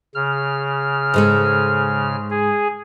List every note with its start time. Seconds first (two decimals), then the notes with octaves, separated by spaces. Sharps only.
0.15 C#3 F6
1.14 G#2 G#3 A4
2.30 G#4